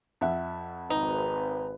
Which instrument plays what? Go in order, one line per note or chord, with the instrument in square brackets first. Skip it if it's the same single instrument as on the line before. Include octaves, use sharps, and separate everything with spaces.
[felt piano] F2 E5 F#5
[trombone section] G#1 B4 [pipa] D#4